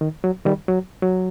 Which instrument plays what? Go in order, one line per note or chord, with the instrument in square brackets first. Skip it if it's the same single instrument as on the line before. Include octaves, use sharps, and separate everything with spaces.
[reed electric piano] D#3
F#3
D#3 G3
F#3
F#3